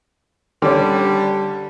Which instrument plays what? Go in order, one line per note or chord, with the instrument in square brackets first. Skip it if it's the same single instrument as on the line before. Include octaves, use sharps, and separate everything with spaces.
[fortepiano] D3 C#4 [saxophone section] G3